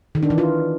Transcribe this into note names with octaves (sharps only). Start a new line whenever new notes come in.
D#3
D4
E3
F4